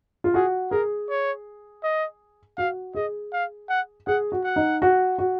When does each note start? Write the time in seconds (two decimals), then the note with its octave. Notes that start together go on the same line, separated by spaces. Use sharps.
0.24 F4
0.34 F#4 G#4
0.71 G#4 A#4
1.10 C#5
1.83 D#5
2.58 F#4 F5
2.95 G#4 D#5
3.33 F5
3.69 F#5
4.07 G#4 F#5
4.32 F#4
4.44 F#5
4.56 D#4
4.82 F#4
5.18 F#4